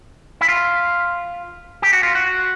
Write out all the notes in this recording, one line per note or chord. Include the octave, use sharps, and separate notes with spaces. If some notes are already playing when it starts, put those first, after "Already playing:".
E4
F4
G4
F#4
F4
F#4